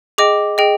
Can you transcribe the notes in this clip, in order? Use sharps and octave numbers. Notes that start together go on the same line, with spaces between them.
G#4 D#5 G5 D6
G#4 D#5 G5